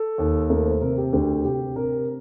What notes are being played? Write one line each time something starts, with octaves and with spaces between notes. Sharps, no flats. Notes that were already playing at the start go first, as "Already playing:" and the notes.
Already playing: A4
D#2
A3 A#4
C5
C3 A#4
G4
D2 G4
C3 G4
C3 A#4